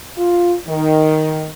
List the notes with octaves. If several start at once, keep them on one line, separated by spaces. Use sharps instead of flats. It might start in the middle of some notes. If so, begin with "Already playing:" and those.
F4
D#3